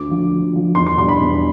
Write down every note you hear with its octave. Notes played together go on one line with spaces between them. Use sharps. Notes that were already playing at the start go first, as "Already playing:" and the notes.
Already playing: D2 D6
D3 F3
D2
D3 F3
E2 C6
C6
B2 G3 D4 C6
B5
E2